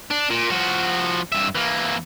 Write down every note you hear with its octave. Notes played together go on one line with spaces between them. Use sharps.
D4
A#2
F3 F#4
G2 E5
E3 A#3